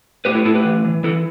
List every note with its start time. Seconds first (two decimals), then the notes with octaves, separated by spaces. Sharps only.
0.25 A2 G4 B4
0.35 E4 A4
0.45 A2 E4 A4
0.54 G4 B4
0.65 E3
0.85 E3
1.03 E3 E4 A4